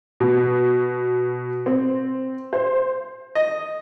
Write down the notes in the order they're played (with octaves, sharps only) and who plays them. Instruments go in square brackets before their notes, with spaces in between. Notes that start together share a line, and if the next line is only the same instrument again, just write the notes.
[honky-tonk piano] B2
C4
C5
[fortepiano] D#5